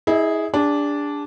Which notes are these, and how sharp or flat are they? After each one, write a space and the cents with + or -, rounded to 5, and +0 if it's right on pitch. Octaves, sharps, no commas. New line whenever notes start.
E4 -30 G#4 +0 D#5 +0
D4 -10 G#4 -45